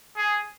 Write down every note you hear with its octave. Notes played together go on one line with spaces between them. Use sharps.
G#4